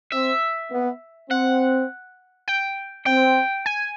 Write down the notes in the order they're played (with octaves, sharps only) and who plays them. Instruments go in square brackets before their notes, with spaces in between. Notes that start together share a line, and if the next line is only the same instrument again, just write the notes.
[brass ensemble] C4 [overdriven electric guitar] E5
[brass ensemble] B3
[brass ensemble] C4 [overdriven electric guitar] F#5
[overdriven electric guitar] G5
[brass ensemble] C4 [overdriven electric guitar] G5
[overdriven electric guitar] G#5